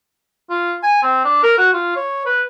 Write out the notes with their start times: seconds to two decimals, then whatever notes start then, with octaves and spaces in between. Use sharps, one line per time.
0.50 F4
0.83 G#5
1.03 C4
1.25 D4
1.43 A#4
1.58 F#4
1.73 F4
1.96 C#5
2.26 B4